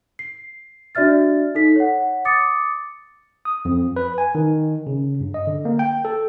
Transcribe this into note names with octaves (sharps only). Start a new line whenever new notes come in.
C7
D4 F#4 D5 E5 F6 A6
D#4 A4 B6
C#5 F#5
D6 D#6 A6 C#7
D#6
F2
B4
G#5
D#3
C#3
G2
D#5
D3
A#3
G5
A4